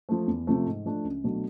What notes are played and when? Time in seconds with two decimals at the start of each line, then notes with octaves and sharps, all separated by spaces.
0.09 F3 A3
0.27 E2
0.47 C3 F3 A3
0.66 G#2
0.85 F3 A3 D4
1.05 C#2
1.24 B2 F#3 A3 D4